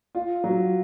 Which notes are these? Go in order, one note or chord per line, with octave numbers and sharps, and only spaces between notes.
F4
F#3